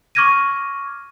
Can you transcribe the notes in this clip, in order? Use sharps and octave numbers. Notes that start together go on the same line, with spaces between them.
C#6 D6 F6 G#6 A#6 D#7